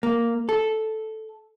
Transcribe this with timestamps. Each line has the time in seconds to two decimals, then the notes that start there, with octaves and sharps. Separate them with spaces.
0.03 A#3
0.49 A4